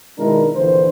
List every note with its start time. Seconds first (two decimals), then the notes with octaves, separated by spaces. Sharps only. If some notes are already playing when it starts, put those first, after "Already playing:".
0.18 B2 D#3 G#3 D4 E4 A#4
0.56 A#1 D3 E3 C5